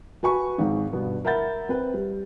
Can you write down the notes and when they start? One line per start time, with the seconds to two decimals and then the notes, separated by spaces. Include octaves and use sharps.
0.23 F#4 B4 G#5 B5 C#6
0.58 G#1 G#2
0.93 G2 B2 B3
1.25 A#4 E5 F#5 B5 G6 A6
1.69 C4 B4
1.94 G3